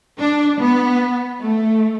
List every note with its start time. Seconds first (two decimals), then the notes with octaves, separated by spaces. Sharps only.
0.19 D4
0.59 B3
1.40 A3